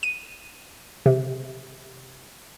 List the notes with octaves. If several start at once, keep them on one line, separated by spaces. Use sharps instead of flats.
D#7
C3